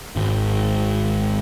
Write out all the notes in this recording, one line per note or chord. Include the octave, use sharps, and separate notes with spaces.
G#1